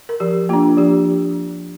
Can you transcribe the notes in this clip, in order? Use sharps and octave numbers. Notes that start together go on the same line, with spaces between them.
A#4
F3 G4
A#3 D4 F4
F3 G4